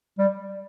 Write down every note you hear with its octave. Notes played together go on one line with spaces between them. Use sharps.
G3